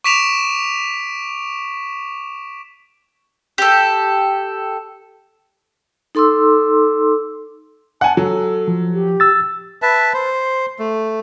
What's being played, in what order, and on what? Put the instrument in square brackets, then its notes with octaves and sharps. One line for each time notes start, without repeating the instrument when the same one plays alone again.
[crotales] C#6 D6 B6 D7 E7 F7
[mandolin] G4 A4
[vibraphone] D#4 A4 C6 D6 E6
[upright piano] F#5 G#5 [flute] A5
[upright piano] F#3 [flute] A4
[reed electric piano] F3
[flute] G4
[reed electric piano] E6 A6
[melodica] B4 E5 A5
C5
A3